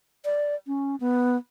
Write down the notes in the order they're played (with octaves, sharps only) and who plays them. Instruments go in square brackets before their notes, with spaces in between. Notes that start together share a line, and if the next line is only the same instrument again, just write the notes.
[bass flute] D5
C#4
B3